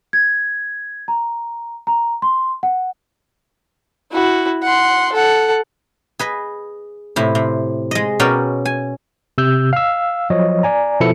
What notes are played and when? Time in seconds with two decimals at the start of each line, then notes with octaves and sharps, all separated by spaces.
0.13 G#6
1.08 A#5
1.87 A#5
2.22 C6
2.63 F#5
4.11 E4 F#4
4.63 F#5 C6
5.12 A4 F#5
6.19 G#4 B4 D#5
7.16 A2 C3 E4
7.35 C3
7.91 G#3 D#5
8.20 B2 C#4 F#4 A#4 D5 G5
8.65 G#5
9.38 C3 E6 G6
9.73 F5 E6
10.30 F3 F#3 C#5 D#5
10.63 D5 G#5 A#5
11.00 B2 F3 B3 E4 A4 C#7